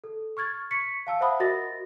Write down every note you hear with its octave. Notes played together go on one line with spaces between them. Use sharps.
A4
C#6 F6 G#6 A6
C#6 B6 C#7
F5 A5 E6
C5 E5 F#5 B5 D#6
F#4 A#4 D#5 A6 A#6